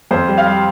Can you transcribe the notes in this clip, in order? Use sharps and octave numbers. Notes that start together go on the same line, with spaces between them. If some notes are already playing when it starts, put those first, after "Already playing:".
F2 C5
G3
F5
G3